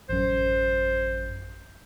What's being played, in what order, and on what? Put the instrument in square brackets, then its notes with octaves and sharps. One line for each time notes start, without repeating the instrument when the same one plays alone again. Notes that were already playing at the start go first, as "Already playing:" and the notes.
[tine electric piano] A1 F#2 [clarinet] C5